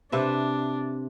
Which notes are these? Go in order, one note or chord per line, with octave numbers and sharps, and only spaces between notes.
C3 D4 B4 E5